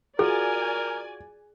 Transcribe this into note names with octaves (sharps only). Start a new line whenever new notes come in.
F4 F#4 G#4 A#4 D5 G#5